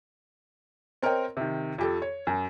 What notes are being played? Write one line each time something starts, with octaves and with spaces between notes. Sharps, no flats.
C4 A#4 C#5 D#5 G5
C3 D#3
F2 G4 A4
C#5
F#2